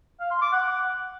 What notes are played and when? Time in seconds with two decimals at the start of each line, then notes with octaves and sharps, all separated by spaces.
0.20 F5
0.31 C6
0.42 D6
0.53 F#5